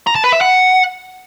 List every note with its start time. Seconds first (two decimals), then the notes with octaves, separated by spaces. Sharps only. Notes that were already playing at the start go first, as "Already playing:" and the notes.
0.07 A#5
0.15 A5
0.24 B4
0.32 E5
0.41 F#5